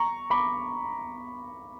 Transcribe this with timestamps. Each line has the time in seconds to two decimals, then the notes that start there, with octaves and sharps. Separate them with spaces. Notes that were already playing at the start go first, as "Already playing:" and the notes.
Already playing: A#5 C#6
0.30 B5 D6